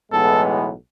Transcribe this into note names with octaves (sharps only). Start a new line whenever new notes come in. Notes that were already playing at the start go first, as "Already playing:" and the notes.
B1 A2 E3 G#3 B3 A4